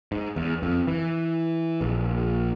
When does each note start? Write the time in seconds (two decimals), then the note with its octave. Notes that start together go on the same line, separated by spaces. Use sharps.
0.12 G#2
0.36 E2
0.63 F2
0.87 E3
1.81 A#1